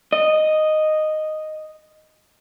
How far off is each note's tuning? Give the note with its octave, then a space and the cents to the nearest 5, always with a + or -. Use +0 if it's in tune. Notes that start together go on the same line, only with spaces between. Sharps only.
D#5 -5